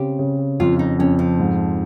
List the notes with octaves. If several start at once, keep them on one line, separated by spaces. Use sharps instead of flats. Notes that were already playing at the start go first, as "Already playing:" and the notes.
Already playing: C#3 C4 G4
C#3
F2 F4
D#4
F2 C#4
F3
G#2